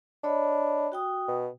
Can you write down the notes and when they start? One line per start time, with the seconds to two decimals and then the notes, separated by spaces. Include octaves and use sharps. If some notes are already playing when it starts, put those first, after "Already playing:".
0.24 D4 C#5 D#5 B5
0.92 F#4 G5 D#6
1.28 B2